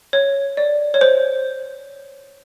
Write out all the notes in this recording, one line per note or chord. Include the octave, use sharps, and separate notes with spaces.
C#5
D5
C#5
C5